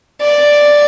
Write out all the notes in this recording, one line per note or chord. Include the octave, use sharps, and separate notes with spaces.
D5